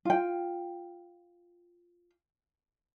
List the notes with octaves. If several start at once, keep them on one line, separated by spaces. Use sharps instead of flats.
F4 G5